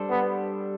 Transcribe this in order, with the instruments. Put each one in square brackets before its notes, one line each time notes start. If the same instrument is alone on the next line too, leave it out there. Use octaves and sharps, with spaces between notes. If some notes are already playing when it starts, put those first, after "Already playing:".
Already playing: [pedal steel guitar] G3 D4 A4 C5
[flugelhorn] B3